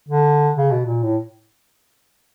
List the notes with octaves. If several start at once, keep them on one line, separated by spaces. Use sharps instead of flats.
D3
C#3
B2
A#2
A2